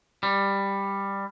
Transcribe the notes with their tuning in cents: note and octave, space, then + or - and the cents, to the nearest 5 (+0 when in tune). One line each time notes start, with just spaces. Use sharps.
G3 +10